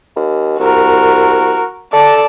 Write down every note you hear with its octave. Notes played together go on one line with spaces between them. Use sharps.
D#2
C2 F#4 A#4
A4 D5 A5